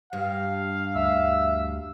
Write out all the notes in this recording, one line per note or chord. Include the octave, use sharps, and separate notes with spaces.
G2 F5
D2 E5